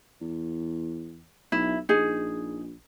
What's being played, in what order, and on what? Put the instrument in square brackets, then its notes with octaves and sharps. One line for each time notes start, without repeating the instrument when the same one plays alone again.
[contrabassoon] E2
[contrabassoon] B1 [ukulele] E4
[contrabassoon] A#1 [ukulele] D#4 G#4